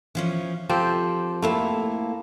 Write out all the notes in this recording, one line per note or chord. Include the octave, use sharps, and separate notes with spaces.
E3 F3 C#4
F3 C4 G4 A4
A2 A3 A#3 E4 F5